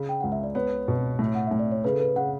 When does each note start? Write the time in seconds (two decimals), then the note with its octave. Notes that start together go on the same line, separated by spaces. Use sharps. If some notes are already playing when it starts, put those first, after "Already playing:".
Already playing: C#3
0.09 G5
0.21 C#2 F#5
0.32 E5
0.43 D5
0.55 B3 C#5
0.88 B2
1.19 A2
1.35 F#5
1.47 A2 E5
1.59 D5
1.72 C#5
1.84 C#3 B4
1.93 A4
2.00 B4
2.16 C#3 F#5